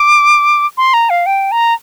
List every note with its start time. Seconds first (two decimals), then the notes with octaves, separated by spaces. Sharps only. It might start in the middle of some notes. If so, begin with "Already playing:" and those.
Already playing: D6
0.78 C6
0.94 A#5
1.10 F5
1.26 G5
1.52 A#5